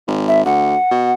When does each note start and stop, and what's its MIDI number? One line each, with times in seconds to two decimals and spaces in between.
0.07 0.43 32
0.28 0.43 76
0.45 0.75 38
0.45 1.14 78
0.91 1.13 47